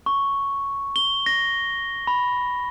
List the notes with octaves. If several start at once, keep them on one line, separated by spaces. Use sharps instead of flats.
C#6
G7
A#6
B5